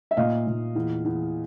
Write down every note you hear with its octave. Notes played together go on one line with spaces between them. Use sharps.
E5
A#2 D#5 F5
A#2
E2
E2